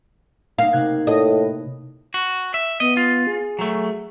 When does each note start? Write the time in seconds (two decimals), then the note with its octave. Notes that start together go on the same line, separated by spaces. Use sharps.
0.58 A#3 D#4 F5
0.73 C3 F#6 G#6
1.07 A2 D#5
2.14 F#4
2.54 E5
2.80 B3 D#5
2.97 F4
3.27 G#4
3.59 F#3 A3